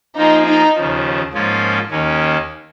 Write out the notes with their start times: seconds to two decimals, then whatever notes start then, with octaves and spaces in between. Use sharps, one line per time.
0.16 F3 A#3 D#4 F4 G#4
0.47 D#4
0.75 D#2 C#3 F3
1.33 G#2 F3 A#3 C#4 F4
1.90 D#2 D#3 A#3 C#4